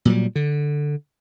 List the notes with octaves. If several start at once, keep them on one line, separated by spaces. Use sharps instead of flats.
A#2 F#3 G3
D3